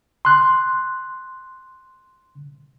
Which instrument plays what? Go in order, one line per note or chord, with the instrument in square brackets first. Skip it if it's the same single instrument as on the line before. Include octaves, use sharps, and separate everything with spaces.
[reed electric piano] C6 F#6